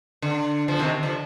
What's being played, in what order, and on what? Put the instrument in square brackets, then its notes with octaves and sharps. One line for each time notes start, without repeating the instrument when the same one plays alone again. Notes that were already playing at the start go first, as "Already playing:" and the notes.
[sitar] D3
D3 F3
C3 D#3
D3 F3